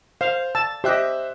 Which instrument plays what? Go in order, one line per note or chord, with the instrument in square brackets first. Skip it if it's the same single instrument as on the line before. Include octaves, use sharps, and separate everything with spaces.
[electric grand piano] C5 [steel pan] F5
[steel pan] A5 [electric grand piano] E6
[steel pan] G4 D#5 [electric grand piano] C5 E5 F#6